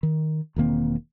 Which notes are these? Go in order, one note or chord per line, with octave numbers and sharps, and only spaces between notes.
D#3
E1 D#3 A#3 C4